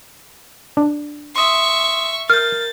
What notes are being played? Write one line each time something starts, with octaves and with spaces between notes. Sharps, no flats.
D4
E5 C6 C#6 D#6
A#4 F6 G6 A6